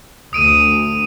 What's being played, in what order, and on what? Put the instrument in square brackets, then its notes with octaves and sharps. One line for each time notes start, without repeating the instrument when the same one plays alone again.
[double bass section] D2 [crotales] D#6 D7 D#7